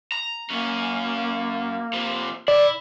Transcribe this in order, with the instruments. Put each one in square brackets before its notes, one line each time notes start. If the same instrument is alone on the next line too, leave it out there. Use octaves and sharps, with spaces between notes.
[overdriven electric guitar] A#5
[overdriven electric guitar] F#2 C#4 [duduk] A#3
[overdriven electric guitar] C3 F3
[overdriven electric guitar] E4 [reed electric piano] D5